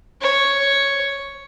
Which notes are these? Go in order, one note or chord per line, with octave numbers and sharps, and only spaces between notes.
C#5